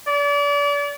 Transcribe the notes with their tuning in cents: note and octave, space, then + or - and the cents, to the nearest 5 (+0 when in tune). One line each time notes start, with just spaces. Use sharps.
D5 -35